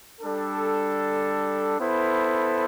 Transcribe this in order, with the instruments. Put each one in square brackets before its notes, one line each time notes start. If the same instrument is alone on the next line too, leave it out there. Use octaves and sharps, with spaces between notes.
[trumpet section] G3 D4 A4
B3 E4 A4 C5